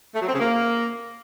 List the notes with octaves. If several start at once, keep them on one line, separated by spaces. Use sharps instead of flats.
A3
F#3
C4
C#3
A#3